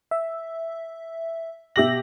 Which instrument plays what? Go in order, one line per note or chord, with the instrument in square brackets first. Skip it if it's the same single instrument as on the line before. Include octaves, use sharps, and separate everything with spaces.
[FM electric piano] E5
[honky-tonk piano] B2 G4 F#7 [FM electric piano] E5 A#6